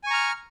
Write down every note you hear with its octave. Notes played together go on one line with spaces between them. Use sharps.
G#5 A#5 C#6 F6